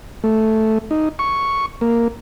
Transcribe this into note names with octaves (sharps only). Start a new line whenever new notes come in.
A3
D#4
C#6
A#3